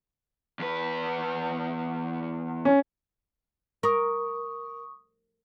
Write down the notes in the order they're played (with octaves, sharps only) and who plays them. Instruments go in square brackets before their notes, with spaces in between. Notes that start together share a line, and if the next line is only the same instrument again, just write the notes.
[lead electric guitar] E2 B4
[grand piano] C#4
[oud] A#4 [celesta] C#6 D#6